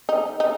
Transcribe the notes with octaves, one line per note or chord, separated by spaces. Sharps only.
D#4
D#4